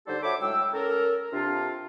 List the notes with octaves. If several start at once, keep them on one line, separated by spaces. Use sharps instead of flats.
D3 G3 D#4 G4 A4 C5
F#4 A4 C#5 E5 B5 D6
A2 F#3 G#3 G5 E6
C#4 A4 A#4
C3 D4 F4